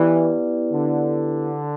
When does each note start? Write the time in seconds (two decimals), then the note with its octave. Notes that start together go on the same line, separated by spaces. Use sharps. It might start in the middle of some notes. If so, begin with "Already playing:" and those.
Already playing: E3 B3 E4 G4 B4 D5
0.71 D3